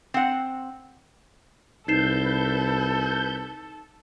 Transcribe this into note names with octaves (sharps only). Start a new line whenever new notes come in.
C4 F#5
C2 D#4 A4 B4 G6 C7 E7